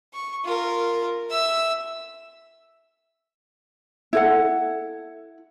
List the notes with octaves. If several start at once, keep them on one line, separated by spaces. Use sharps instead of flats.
C#6
F4 A#4
E5 E6
E4 A4 F#5